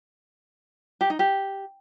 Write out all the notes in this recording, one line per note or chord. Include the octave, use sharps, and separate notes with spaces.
G4
D#4
G4